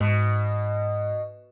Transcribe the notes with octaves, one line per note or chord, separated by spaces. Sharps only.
G#2 B2